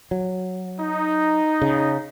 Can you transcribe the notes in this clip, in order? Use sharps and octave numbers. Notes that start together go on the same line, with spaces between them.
F#3
D#4
C#3